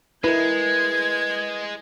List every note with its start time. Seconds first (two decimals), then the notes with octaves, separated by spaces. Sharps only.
0.24 G#3 E4 A#4 B4 G#6